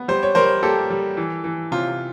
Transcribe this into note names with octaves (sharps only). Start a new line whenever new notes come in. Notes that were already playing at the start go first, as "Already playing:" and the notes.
Already playing: B3
G3 C5
C#5
G3 A#4 C5
A#3 G4 A4
G3
E3
E3
C3 F4